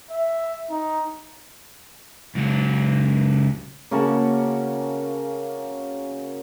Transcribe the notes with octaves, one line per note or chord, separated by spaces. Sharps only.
E5
D#4
C#2 F#3
C#3 A#3 F#4 A5